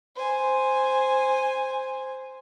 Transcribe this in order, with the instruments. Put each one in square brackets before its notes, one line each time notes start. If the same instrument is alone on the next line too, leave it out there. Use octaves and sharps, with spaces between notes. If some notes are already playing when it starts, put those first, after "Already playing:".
[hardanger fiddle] C5 G#5